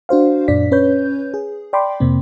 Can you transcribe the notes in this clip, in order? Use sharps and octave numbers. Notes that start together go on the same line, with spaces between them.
D4 F#4 C5 F5
F#2 A#2 D4 D5 B6
C#4 B4 C#5 G6
G#4
D5 G5 B5 C6 D6
F2 C3 A#3 C4